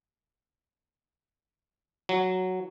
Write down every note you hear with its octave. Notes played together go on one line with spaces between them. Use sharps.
F#3